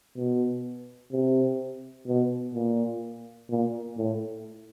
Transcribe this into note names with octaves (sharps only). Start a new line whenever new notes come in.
B2
C3
B2
A#2
A#2
A2